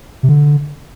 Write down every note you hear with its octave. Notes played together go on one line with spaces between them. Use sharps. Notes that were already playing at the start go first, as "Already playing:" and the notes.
C3
D3